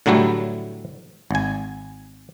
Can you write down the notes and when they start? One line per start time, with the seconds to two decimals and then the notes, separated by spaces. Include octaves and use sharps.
0.06 A2 D3 F#3 G3 A3 E4
1.31 G#1 G#5